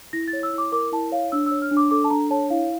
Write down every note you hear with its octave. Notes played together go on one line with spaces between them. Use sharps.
E4 A#6
A6
C#5
E6
E4 D6
A#4 D6
E4 A5
C#5 F5
D4 E6
C#5 E6
F6
D4
D6
A4 D6
A5
D4 A#5
C#5 A5
E4 F5